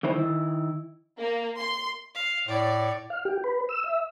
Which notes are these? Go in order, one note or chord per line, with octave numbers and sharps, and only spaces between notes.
D3 D#3 E4 C5
D#3 E4
A#3
C6
F5
A2 C#5 D5
F5
G4
B4
E6
E5